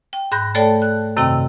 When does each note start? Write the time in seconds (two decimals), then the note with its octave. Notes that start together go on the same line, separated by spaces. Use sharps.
0.13 G5
0.32 G#2 B5 F#6 G6 A#6
0.55 A3 A4 C#5 D5 G5 A5
0.82 F#6
1.16 F#2 C3 D#3 C4 G5 E6